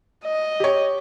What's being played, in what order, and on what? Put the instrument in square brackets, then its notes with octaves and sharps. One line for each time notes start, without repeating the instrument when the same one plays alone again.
[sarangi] D#5
[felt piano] G4 C#5